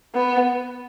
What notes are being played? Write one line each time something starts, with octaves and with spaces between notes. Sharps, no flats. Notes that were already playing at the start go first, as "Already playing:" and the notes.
B3